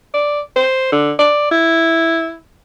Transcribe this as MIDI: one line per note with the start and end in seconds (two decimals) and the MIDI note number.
0.14 0.40 74
0.56 0.92 72
0.92 1.13 50
1.19 1.47 74
1.51 2.36 64